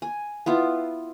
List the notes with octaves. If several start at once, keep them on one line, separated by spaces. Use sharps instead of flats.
G#5
B3 E4 F4